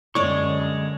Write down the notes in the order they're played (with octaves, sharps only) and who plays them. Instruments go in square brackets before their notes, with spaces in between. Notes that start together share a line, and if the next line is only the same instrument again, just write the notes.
[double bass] F#2 D3 [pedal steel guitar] G#3 C#6 [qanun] C#5 D5